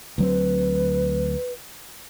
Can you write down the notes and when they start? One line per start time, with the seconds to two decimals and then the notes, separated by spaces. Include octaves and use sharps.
0.18 D2 F#3 C4 B4